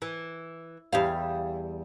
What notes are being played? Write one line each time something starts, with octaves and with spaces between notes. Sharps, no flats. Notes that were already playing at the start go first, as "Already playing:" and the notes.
E3
E2 G3 F5